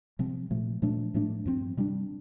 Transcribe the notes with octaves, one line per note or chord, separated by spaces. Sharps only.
C3 F3 C4
A#2 F3 A3
A#2 F3 A3 D4
A2 F3 A3 D4
G2 F3 C4
C3 G3 D4